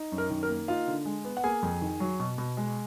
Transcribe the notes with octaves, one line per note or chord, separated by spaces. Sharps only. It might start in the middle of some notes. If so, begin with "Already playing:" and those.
Already playing: D#4
F#2
A#4
D#3
A#4
A#3
D#4 F4 F5
D3
G#3
B3
F#5
A#3 G#4 G#5
F2
D#3
F#3
B2
B2
G#3